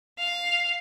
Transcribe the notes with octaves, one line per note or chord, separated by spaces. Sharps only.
F5